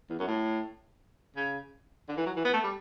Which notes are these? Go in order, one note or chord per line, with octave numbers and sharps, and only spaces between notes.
E2
F#2
A2
C#3
D3
E3
F#3
E3
B3
A3
G3